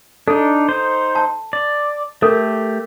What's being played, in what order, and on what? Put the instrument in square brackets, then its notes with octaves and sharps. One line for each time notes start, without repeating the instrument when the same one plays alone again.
[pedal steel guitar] D4 D#4 [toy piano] A4
[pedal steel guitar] D#4 C5
[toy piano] A5
[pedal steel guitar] D5
[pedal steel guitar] A3 G4 [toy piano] A4 A#4